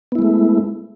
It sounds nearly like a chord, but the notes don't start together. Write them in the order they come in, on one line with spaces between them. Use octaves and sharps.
B3 E4 G#3 A3